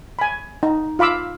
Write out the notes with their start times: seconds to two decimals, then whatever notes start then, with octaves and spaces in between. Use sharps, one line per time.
0.19 G#5 B5
0.63 D#4
0.99 F4 F5 B5 D6 E6